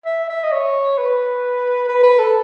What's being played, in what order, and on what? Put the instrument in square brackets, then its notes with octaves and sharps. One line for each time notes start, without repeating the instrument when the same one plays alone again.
[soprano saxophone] E5
E5
D#5
C#5
B4
B4
B4
A4